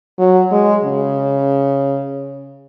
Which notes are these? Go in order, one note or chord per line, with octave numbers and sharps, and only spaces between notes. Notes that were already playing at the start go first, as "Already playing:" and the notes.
F#3
G#3
C#3